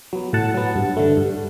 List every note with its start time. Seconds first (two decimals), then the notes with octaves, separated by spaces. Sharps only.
0.13 F#3 B3
0.33 A2 F#5 A5
0.54 F#3 B3
0.76 G2
0.97 D3 A3
1.17 G2